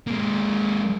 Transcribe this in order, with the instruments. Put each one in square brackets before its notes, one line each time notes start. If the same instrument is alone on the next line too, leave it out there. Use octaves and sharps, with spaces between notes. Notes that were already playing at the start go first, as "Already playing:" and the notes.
[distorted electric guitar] G#3 A#3